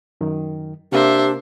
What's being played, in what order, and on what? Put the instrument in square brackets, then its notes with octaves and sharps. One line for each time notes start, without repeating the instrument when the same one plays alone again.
[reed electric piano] F#2 D#3
[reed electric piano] C3 A#3 A#4 [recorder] D4 [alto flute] G4 [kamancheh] C5 E5